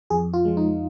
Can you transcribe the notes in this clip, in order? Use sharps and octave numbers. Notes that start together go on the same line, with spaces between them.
F2 G#4
F4
F3 G#3
D#4